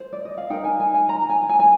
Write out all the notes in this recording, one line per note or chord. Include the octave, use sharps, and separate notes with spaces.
C5
D5
D#5
F5
D#4 A#4 G5
G#5
G#5
G#5
A#5
G#5
G#5
G#5